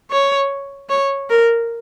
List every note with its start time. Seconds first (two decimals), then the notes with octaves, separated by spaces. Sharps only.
0.11 C#5
0.89 C#5
1.30 A#4